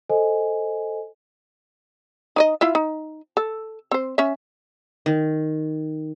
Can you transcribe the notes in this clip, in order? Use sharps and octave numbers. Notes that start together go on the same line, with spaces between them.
A4 C5 D#5 G#5
D#4 D5 D#5
E4 F4 E5
D#4
A4
C4 C5
C#4 E5
D#3